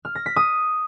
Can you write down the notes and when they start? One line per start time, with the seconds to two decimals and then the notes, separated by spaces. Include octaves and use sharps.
0.05 F6
0.15 A#6
0.26 B6
0.36 D#6